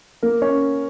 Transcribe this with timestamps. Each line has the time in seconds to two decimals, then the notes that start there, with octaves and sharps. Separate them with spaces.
0.23 A#3 A#4
0.42 C#4 C#5